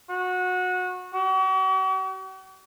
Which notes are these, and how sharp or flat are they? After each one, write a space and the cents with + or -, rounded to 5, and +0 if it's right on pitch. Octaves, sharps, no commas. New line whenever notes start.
F#4 -20
F#4 +45